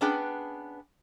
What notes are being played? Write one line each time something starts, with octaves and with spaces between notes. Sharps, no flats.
B3 C#4 D4 G#4 B4 G5